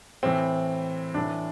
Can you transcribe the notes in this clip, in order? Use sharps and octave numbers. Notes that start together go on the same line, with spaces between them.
A2 E3 C4
A2 E3 D4